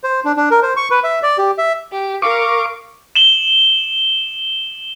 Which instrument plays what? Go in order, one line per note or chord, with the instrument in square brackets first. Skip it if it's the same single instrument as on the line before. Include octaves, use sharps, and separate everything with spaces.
[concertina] C5
D4
D4
A#4
C5
C#6
B4
E5
D5
G4
E5
[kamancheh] G4
[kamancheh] A#4 F5 [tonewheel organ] C#6 D6
[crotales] E7 F#7 G7